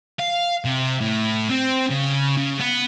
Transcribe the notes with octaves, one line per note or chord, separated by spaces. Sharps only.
F5
C3
A2
C4
C#3
C#3
B3